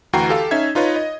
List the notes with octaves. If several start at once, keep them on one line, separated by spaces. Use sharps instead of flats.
D2 E3 F#4 G5 A#5 C7
G4 A4 F5
C#4 D#4 E5 G#6
D#4 F4 B4 C#5 D#5
D#5